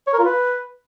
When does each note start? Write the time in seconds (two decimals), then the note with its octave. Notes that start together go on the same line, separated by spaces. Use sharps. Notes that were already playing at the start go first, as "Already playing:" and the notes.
0.07 C#5
0.13 A#4
0.19 F4
0.25 B4